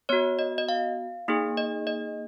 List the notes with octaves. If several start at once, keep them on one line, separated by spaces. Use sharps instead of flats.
B3 F#4 C#5
D#5
D#5
F5
A#3 D#4 G#4
D#5
D#5